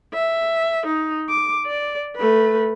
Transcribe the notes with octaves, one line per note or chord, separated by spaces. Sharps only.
E5
D#4
D6
D5
A3 B4